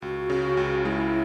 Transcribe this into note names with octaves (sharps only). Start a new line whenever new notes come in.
C#2 F#4
C#3
C#2
G#3 E4